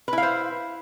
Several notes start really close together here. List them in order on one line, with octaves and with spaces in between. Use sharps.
B4 E4 F5 C5